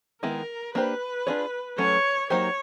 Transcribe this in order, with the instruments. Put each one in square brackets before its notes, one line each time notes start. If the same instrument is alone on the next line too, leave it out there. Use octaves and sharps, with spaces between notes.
[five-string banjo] D#3 G#3 B3 E4 [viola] A#4
[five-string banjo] A#3 D4 G4 C5 [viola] B4
[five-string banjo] D4 F4 G#4 C#5
[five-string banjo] F#3 A3 C#4 [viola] C#5
[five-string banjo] F#3 A#3 D#4 G4 C5 [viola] C#5